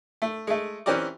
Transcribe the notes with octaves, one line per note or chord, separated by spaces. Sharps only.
A3
G#3 A3
E3 C4 C#4 G4 A#4 D5